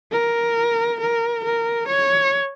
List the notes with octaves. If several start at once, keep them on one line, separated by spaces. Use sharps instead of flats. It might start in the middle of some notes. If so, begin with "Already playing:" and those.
A#4
A#4
A#4
C#5